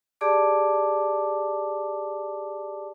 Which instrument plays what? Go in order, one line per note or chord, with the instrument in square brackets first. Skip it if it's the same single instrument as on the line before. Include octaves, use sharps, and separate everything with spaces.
[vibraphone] G4 G#4 D5 A5 D6